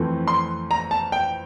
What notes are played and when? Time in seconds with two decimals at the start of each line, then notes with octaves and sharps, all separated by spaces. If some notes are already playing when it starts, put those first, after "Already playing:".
Already playing: F2 E3 A3 C4
0.28 C6
0.71 A#5
0.91 A5
1.12 G5